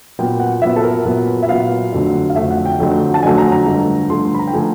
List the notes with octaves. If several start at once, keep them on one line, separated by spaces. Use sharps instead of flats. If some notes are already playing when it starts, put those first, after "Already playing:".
A#2 F#3 B3 G5
F#5
A#2 F#3 B3 E5
A4
A#4
A#2 F#3 B3
E5
A#2 F#3 B3 F5
F2 D3 F#3 A3
F5
F2 D3 F#3 A3 E5
F#5
G5
F2 D3 F#3 A3
A5
F2 D3 F#3 A3 G#5
A#5
A#5
G2 D3 F3 A3
G2 D3 F3 A3 C6
C6
B5
A#5
G5
D3 F3 A3 G#5